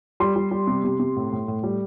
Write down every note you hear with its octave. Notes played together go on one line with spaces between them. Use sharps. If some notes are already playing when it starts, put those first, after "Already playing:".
G3 C6
G3
G3
C3
C3
C3
A2
A2
A2
G3